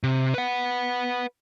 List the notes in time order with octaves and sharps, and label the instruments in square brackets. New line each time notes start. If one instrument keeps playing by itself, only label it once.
[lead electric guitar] C3
B4 F#5